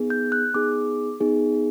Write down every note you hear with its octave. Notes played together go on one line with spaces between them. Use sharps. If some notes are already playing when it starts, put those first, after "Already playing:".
Already playing: B3 D#4 G#4
G6
F#6
B3 D#4 G#4 D6
B3 D#4 G#4